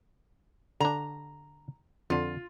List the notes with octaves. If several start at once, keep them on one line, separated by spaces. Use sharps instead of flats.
D3 D4 A#5
F2 D3 F4